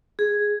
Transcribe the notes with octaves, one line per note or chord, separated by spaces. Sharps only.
G#4